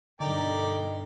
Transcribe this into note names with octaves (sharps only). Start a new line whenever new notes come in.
G2 B2 D3 D#4 A#4 D5 G5